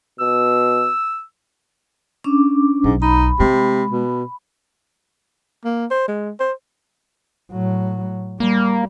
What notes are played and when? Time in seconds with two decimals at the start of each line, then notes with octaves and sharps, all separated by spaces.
0.20 B2 E6
2.24 C#4 D4 D6
2.84 B1 G#2
3.02 D#4 B5
3.40 C3 G#3
3.91 B2
5.65 A#3
5.91 C5
6.08 G#3
6.40 C5
7.51 A2 F#3
8.40 G3 A#3